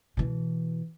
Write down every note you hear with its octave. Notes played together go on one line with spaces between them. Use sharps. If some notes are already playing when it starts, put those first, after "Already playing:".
B2 E3